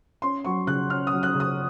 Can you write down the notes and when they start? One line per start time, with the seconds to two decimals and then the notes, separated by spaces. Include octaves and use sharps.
0.22 C#4 C6
0.45 F#3 C#6
0.67 C#3 F#6
0.90 C#4 F6
1.07 D#6
1.13 F#3
1.23 F#6
1.35 C#3
1.40 D#6